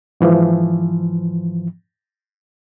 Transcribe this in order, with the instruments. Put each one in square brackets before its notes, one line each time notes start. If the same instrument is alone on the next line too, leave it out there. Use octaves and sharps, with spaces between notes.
[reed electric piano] G#2 E3 F3